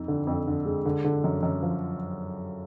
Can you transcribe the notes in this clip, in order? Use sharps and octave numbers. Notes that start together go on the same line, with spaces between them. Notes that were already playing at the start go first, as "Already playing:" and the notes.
Already playing: F2 D#4
D3
F2
D3
G#3
D3
D3
F#2
F#2
F3